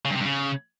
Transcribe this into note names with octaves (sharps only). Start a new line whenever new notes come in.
C#3
G2
C3
G2
C#3